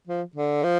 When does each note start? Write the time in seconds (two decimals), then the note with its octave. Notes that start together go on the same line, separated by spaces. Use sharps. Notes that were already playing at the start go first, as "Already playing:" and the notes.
0.07 F3
0.35 D3
0.63 F3